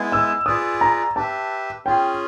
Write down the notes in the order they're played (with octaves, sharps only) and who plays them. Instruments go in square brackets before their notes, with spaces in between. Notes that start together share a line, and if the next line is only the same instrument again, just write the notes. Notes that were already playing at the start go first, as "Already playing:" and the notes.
Already playing: [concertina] G#3 B3 E4 G#4
[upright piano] E6
[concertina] F4 G#4 B4 D5 [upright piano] D#6
[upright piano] A#5
[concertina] G4 B4 E5 [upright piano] A5
[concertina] C#4 F4 G#4 [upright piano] G5